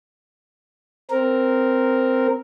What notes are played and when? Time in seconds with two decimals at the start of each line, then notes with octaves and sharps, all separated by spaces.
1.11 C4 A#4